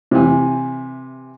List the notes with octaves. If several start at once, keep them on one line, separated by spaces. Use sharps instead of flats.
C3 E3